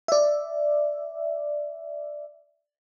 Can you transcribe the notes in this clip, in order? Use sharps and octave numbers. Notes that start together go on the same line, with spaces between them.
D5 E5